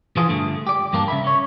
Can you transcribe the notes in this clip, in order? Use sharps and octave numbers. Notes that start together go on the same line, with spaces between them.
E3 F3 F4 G#4
G2 D3 A3
G4 D5
G2 G3 A#3 D4
C#3 E5 B5
C#4 C#5